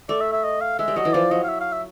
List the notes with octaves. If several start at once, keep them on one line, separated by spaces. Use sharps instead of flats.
A3 D5
E5
E5
D#5
F5
G#3 E5
G3
F#3 D#5
E3
F3 D5
F#3 D#5
F5
E5
F5
E5